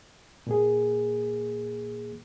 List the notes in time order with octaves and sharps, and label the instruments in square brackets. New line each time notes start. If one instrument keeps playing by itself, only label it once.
[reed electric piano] A#2 A#3 G#4